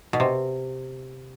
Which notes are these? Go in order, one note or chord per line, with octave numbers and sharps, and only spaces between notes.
B2
C3